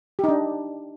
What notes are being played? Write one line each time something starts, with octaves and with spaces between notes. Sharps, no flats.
D4 D#4 G4